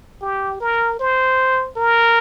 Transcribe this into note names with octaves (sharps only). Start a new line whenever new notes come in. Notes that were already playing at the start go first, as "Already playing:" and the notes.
G4
A#4
C5
A#4